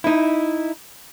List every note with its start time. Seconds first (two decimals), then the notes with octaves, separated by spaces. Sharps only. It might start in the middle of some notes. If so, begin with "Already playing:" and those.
0.04 D#4 E4